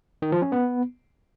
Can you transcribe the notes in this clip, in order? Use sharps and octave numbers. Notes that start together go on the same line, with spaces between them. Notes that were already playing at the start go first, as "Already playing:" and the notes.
D#3
F3
C#4
B3